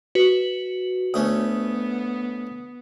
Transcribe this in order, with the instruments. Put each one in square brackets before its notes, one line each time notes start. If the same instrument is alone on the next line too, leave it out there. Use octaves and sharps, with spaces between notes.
[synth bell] F#4 B4
[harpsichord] D2 A3 C#4 [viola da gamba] B3 [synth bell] D#6